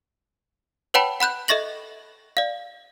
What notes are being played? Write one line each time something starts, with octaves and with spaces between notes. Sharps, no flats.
B4 C#5 F#5 G5 A5 B5
F#5 B5 F#6 G6
A4 D#5 E5 C#6 A#6 F#7
D5 F5